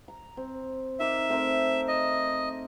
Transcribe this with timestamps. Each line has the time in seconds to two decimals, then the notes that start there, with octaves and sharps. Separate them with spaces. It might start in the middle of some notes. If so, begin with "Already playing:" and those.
0.08 A#5
0.37 C4
1.00 D#4 A#4 E5 D6
1.29 A3 C4 A#4
1.88 D#5